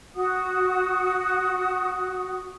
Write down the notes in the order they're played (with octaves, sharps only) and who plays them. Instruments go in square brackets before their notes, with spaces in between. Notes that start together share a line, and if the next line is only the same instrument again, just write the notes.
[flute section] F#4 F#5 D#6